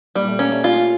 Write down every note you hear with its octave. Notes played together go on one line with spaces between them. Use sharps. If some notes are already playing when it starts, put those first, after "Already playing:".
A#2 G3
A3
A#3 C#4
A3
F4